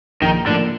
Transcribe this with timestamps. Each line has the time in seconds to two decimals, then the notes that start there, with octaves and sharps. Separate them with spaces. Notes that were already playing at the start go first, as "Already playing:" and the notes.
0.22 A#1 D#3 D#4
0.46 A2 D3 F3 A#3 D4